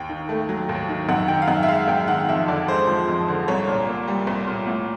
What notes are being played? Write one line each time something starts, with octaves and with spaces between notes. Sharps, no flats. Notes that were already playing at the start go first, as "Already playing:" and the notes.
Already playing: D#2 G5
D#3
A3
F#3
D#2
D#3
F#2 F#5
D#3 G5
F5
F#2 F#5
E5
G#3 F5
F#2 G5
D#3 F#5
F2 E5
D3 D5
G#3 C5
F3
F2
D3
C2 C#5
A#2
A#3
G3
C2
A#2
A2